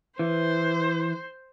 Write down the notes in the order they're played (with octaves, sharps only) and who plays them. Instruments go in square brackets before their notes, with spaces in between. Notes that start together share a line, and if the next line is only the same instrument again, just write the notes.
[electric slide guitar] E3 [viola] C5